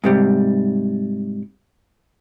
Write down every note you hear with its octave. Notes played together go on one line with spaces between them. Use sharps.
G#2 C3 G3